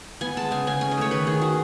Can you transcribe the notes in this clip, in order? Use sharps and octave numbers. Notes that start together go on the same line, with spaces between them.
B3 G#5
G#3 A5
C#3 G#5
C#3 G#5
C#4 G#5
D#5
A3 C#5
D#3 B4
D#3 G#4
C#4 F#4